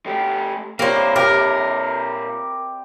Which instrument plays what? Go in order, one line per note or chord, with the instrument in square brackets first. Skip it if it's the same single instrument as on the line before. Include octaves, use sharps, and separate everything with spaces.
[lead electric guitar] A3 G4
[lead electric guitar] A#2 C#5 [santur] G3 C4 [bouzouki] A#3 C5
[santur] G4 E5 [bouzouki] A#4